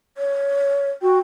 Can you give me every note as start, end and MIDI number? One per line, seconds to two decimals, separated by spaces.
0.18 0.91 73
1.02 1.19 66
1.02 1.19 79